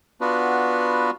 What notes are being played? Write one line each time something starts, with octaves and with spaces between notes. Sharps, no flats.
B3 D4 F4 F#4 B4